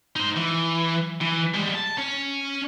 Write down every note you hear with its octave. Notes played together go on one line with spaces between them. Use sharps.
D#4 C5
E3
E3
G3 G#3
A5
C#4 C#5